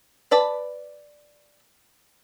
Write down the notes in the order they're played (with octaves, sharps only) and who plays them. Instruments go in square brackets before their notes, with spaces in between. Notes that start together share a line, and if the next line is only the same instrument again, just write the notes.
[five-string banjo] B4 D5 A5 B5